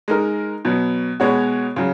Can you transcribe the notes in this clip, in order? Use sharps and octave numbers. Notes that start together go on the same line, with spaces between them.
G#3 D#4 A#4
B2 F#3 B3
B2 G#3 B3 F#4 C#5
C#3 F#3